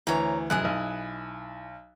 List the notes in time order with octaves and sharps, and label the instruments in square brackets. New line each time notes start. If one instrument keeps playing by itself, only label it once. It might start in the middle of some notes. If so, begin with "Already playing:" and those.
[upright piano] D2 E3 [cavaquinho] C#5 A#5
[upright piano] F1 F#2 F#6 [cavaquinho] E4 G#4 D#5
[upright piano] B1